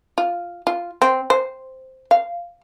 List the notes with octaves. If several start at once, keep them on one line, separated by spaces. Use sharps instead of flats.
F4
F4
C4
C5
F5